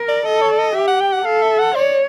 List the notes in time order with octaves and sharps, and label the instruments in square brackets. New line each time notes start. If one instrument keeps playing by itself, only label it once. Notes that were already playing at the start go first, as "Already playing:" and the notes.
Already playing: [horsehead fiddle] A#4
[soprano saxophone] D5
[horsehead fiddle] A4 [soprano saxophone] D#5
[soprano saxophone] C#5
D5
D#5
[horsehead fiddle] G4 [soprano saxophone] E5
[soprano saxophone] F#5
G5
F#5
[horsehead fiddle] A4 [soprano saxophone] F5
[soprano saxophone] E5
F#5
[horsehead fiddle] C#5 [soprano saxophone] D5